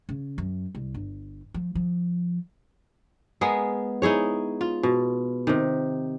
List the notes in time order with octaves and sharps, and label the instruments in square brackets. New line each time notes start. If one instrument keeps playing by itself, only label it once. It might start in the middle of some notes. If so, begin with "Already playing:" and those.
[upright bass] C#3
F#2
C2
G1
F3
F3
[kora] G#3 B3 G#4 A#4
D#4 E4 G#4 C#5
F4
B2
C3 D#3